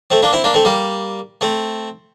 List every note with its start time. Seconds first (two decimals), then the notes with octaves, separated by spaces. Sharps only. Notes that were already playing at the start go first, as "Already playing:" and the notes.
0.10 A3 C4
0.22 A#3 D4
0.33 C4 E4
0.44 A#3 D4
0.54 A3 C4
0.65 G3 A#3
1.41 A3 C4